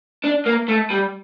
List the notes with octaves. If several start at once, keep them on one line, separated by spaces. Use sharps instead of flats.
D4
A#3
A3
G3